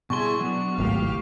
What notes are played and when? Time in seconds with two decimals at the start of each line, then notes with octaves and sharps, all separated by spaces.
0.10 B2 G3 E4 G#4 G#5 C6 C#6
0.41 F#3 B3 D4 F#4
0.78 G#1 C#2 A2 G4 F5